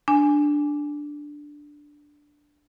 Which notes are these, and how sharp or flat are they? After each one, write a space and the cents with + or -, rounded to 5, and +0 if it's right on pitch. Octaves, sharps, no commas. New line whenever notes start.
D4 +0 G#5 +0